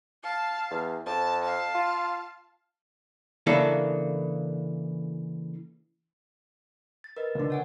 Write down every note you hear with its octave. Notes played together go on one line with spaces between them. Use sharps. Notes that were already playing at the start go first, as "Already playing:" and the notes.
F5 A5
E2
F2 A5
F5 A5
F4
C#3 E3 A#3 D4 E4 A4
A6
A#4 B4 D#5
C#2 D3
C#5 F#5 G#5